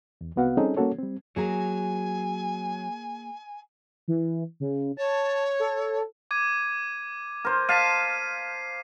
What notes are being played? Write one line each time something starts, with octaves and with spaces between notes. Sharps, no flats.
E2
C2 C3 B3 F#4 F5 F#5
G3 C4 C#4 D#4 G#4 A4
G3 A#3 C#4 F#4 A4 C#5
G3 C4
F#3 A#3 G#4 G#5 A#5
E3
C#3
C#5 A5
A4
D6 G#6 D#7
A#4 C5
F5 A5 B6 C7 D#7